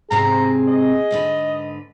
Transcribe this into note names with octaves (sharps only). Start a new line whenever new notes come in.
G#2 C3 C4 G#4 A#5
D#5
G#2 D3 B4